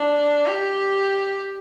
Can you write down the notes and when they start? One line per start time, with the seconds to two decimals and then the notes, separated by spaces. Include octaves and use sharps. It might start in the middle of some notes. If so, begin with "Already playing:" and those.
Already playing: D4
0.47 G4